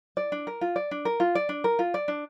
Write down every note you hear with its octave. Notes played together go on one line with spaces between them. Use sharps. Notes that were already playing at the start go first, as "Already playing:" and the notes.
D5
D4
A#4
F4
D5
D4
A#4
F4
D5
D4
A#4
F4
D5
D4